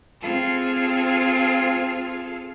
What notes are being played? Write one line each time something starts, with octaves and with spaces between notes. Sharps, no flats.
C4 F4 G#4 A4 F6